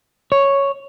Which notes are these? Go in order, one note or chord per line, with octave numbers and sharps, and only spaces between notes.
C#5